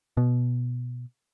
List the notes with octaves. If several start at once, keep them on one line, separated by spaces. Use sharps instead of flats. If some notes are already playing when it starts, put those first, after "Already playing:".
B2